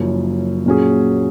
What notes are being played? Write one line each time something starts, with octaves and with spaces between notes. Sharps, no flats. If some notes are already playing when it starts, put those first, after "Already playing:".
Already playing: F#1 F#2 F3
A#2 F#3 C#4 G#4